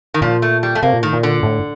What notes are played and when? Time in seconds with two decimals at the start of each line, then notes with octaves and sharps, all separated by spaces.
0.14 D#3
0.22 A#2 F3
0.42 A3
0.63 G3
0.75 A3
0.83 C3 A#3
0.93 A#2
1.03 A2 D#3
1.13 A#2
1.23 D3
1.43 A2